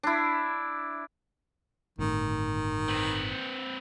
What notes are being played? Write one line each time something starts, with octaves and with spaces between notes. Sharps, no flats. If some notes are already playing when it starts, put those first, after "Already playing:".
D4 E4
G1 A2 D#3
C4 B4